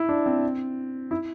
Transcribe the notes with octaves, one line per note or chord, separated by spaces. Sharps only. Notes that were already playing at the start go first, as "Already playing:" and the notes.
Already playing: E4
D4
C4
E4